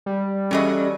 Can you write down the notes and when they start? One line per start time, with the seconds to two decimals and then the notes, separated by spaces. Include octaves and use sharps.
0.06 G3
0.51 E3 F#3 C#4 G#4 A4 D#5